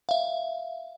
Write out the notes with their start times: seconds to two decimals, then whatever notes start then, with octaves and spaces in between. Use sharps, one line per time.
0.09 E5 F5